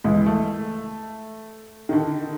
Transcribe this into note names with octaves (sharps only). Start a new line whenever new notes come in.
C#2 E3 G#3
A3
D3 D#3